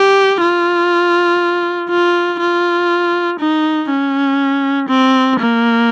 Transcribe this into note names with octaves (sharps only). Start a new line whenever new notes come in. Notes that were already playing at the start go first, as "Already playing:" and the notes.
Already playing: G4
F4
F4
F4
D#4
C#4
C4
A#3